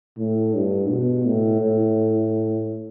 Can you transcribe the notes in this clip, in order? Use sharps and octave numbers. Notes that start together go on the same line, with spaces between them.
A2
G2
B2
A2
A2